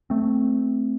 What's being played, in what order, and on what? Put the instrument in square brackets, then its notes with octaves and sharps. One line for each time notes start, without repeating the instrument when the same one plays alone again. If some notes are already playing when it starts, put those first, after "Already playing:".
[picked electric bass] A3 C4